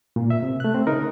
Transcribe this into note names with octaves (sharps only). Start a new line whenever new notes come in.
A#2
E5
C3
A3 F#6
C4
C#3 D#4 A#4